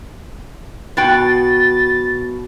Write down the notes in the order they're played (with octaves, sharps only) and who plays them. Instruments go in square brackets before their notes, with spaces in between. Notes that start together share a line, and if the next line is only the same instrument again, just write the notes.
[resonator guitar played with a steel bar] B2 F#4 G5 [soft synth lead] A6